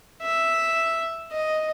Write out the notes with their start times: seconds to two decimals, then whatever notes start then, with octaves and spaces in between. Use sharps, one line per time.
0.22 E5
1.32 D#5